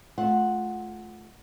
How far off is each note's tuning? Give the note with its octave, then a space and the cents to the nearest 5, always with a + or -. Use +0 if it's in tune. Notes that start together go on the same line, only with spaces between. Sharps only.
A3 -30 F4 +0 F#5 +0